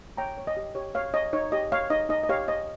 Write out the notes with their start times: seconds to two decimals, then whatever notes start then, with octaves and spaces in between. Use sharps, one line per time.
0.17 C#5 G5 A#5
0.38 C#5
0.47 D#5
0.57 G4
0.75 G4 C#5
0.95 C#5 F5
1.14 C#5 D#5
1.33 D#4 C#5
1.52 G4 D#5
1.72 C#5 F5
1.90 D#4 D#5
2.09 D#4 D#5
2.23 D#5
2.29 G4 C#5 F5
2.48 C5 D#5